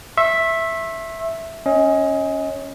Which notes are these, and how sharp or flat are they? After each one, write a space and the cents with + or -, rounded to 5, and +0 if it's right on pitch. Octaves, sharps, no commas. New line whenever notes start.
E5 +0 C#6 -45
C#4 -5 D#5 +25